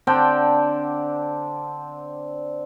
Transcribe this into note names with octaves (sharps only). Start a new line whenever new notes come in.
D3 C4 D4 G5